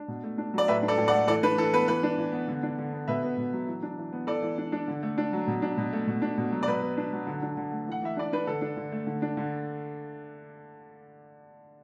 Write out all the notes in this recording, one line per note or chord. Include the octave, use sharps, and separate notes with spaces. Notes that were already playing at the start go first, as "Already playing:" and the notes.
Already playing: D4
B2
A3
D4
F#3 D5
A2 B4 E5
D4
A4 D5
A2
D5 F#5
A3
E3 A4 D5
D4 B4
E3 A4
B3 B4
E3 B4
D4
E3
B3
D3
D4
D3
B3
B2 B4 E5
B3
B2
F#3
E3
D4
E3
B3
E3 A4 D5
E3
D4
D4
D3
A3
D4
F#3
B2
D4
B2
A3
B2
D4
B2
F#3
D5
B2 B4
B3
D4
F#3
D3
D4
D3
A3
E3 F#5
E3 E5
D4 D5
D4 B4
D3 A4
D4
D3
A3
D3
D4
D3